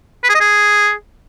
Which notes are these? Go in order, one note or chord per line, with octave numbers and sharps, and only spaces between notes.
B4
G#4
D#5
G#4